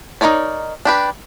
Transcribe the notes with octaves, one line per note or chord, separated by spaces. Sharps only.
D#4 F4 A#4 C#5 D5
D4 G4 B4